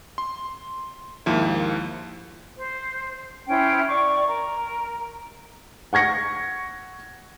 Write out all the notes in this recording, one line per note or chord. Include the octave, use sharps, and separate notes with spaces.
C6
D#2 G#2 F3 A#3 E4
C5
C#4 E4 C5 G5
D5 C#6 D6
A#4
F#5 C#6 G#6 A#6 C#7